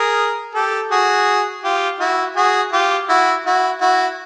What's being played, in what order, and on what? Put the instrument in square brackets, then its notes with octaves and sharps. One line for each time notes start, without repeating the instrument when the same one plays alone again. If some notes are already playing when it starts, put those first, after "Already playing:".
Already playing: [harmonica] G#4 A#4
G4 A4
F#4 G#4
F4 G4
E4 F#4
F#4 G#4
F4 G4
E4 F#4
E4 F#4
E4 F#4